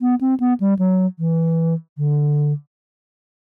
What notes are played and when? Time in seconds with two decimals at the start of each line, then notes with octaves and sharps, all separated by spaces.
0.01 B3
0.21 C4
0.40 B3
0.60 G3
0.79 F#3
1.19 E3
1.98 D3